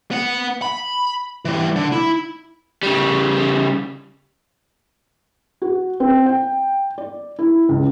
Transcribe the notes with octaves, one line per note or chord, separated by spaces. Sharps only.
B3 F#5
B5
E3 G3
D3
E4
C#3 G3
F#4
C4
G5
D5
E4
C#2